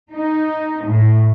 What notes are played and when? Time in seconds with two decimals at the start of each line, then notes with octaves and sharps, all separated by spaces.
0.11 D#4
0.84 A2